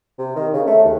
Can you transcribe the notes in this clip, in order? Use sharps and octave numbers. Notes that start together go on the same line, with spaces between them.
C3
D#3
C#3
A3
D#2